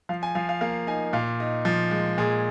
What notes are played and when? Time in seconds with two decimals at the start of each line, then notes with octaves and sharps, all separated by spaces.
0.09 F3 F5
0.23 G#5
0.35 F3 F5
0.49 F5
0.61 A#3 F5
0.87 D#4 G#5
1.13 A#2 F5
1.40 D#4
1.65 F3
1.91 G#3
2.18 A#2 G#4